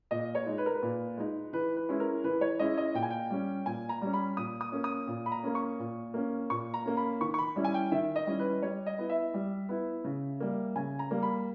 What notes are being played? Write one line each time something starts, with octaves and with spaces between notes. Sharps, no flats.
A#2 D#5
C#5
G#3 D#4
B4
A#4
B4
A#2
G#3 D#4
E3 B4
B4
G#3 C#4 E4
A#4
E3 B4
C#5
G#3 C#4 E4 D#5
D#5
A#2 G5
G#5
G5
G3 C#4
A#2 G#5
A#5
G3 C#4
B5
A#2 D#6
D#6
A#3 C#4
D#6
A#2
B5
A#5
A#3 C#4
C#6
A#2
A#3 C#4
A#2 C#6
A#5
A#3 C#4
B5
D#3 C#6
C#6
B5
G3 C#4 E4
G#5
G5
D#3 E5
D#5
G3 C#4 E4
B4
G3 C#5
D#5
B3 E4
E5
G3
B3 E4
C#3
G3 A#3
C#3 G#5
A#5
G3 A#3
B5